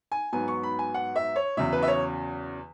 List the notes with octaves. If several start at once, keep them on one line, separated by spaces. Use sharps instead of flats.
G#5
G#2 F#3 B3 G#5
C#6
B5
G#5
F#5
E5
C#5
E2 C#3 F#3 E5
B4
E5
C#5